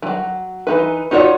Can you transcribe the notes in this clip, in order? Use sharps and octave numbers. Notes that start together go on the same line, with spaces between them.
E3 F#3
E3 D#4 B4
D#4 F4 F#4 C#5 D5